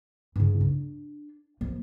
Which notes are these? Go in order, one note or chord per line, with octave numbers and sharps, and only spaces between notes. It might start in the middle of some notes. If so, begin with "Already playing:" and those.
G2 C#3
D4
F3 A#3